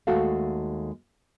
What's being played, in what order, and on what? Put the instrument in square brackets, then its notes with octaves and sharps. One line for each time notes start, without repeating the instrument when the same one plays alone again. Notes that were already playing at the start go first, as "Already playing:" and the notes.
[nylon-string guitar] D#2 G#3 A3 F#4 A4 F5